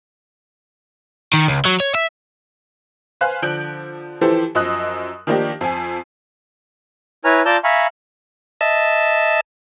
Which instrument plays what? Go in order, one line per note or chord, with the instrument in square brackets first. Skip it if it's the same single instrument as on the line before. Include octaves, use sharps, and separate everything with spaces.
[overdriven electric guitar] D#3
C#2
F#3
C#5
E5
[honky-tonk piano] B4 C5 F5 G#5 F#6
D3 F3 G6 D7 F#7
E3 F3 E4 G4 A4 C5
F#2 F3 D#5 D#6 F#6
D#3 F3 A#3 D4 D#4 G4
F2 F3 G#5
[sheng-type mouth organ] E4 B4 C#5 G#5 A#5 F6
F4 D5 A5 A#5 E6 G6
E5 F5 G#5 A#5 B5 C#6
[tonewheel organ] D#5 E5 A5